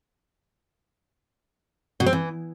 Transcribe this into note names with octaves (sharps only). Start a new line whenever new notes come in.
B2
C4
E3